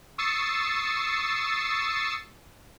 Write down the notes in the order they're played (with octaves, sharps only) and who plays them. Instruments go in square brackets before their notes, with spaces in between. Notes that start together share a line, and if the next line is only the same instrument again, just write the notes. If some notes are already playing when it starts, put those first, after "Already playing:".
[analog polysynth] C#6 D#6 E6 A6 C7 C#7